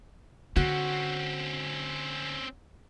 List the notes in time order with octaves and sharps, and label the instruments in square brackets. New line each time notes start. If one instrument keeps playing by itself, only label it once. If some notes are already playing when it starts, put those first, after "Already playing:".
[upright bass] D3 [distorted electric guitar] C4 C#4 [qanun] F#4